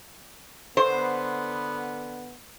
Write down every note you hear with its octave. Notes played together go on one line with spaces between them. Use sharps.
D3 B3 C5